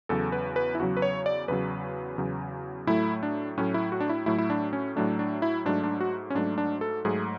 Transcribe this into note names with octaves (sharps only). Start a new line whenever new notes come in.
E2 C#3 F#3 A4
B4
B4
E4
E2 C#3 F#3 F#4
B4
C#5
D5
E2 C#3 F#3 B4
E2 C#3 F#3
A2 F#3 A3 E4
D4
A2 F#3 A3 C#4
E4
F#4
D4
E4
A2 F#3 A3 E4
E4
D4
C#4
A2 F#3 A3 D4
D4
E4
G#2 F#3 A3 D4
D4
F#4
C#4
G#2 F#3 A3 D4
D4
A4
G#2 F#3 A3 G#4